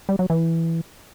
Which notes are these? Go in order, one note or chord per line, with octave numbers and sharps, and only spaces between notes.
G3
F#3
E3